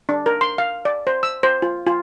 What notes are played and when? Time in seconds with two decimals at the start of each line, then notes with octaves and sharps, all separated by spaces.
0.09 D4
0.26 A#4
0.41 C6
0.58 F5
0.85 D5
1.07 C5
1.23 E6
1.43 C5
1.62 F4
1.87 F4